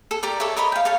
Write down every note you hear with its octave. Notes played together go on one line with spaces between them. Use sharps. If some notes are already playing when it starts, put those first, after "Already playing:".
A4
G4 A#4 D5
A4 C#5 E5
A#4 C#5 D#5 B5
F5 G5
A4 C#5 F5